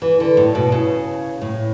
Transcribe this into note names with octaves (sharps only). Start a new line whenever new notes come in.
E3
D3
A2
B2
C#3
A2